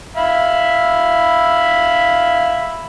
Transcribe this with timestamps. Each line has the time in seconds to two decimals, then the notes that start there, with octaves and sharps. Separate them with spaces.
0.16 E5 F5 B5